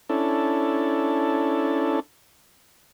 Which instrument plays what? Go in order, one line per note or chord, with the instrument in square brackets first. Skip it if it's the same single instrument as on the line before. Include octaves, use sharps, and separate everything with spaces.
[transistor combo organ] C#4 D4 E4 A4